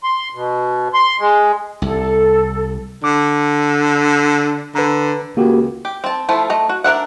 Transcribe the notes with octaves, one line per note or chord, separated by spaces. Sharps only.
C6
B2
C6
G#3
C2 A4
D3 D6
D3 B4 A#5
C#2 A#3 F#4 G4
G4
C4 A5
F3 A3 E4 F4
A3 D#5 A#5
F#4
D4 A#4 E5 F#5